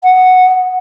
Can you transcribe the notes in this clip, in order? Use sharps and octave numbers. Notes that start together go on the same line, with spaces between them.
F#5